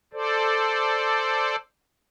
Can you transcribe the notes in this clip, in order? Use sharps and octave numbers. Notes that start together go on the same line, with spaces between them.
A4 C5 D5